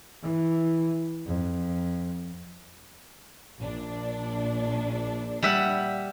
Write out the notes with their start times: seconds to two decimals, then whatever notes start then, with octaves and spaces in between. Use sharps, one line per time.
0.23 E3
1.26 F2
3.59 A#1 D4
5.43 G3 E5 F#5